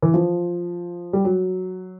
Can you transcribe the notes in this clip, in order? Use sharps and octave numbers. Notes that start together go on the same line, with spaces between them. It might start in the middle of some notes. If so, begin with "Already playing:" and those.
E3
F3
G3
F#3